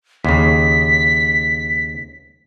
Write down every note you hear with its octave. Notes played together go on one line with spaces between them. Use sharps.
D#2 C#3 B6